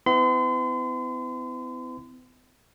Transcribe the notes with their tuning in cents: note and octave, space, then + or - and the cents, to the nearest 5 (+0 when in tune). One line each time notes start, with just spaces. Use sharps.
B3 +45 E4 +0 C6 -40